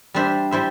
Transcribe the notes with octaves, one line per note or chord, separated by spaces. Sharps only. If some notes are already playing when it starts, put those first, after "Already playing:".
G3 D4 C5 E5
G3 E4 C5 E5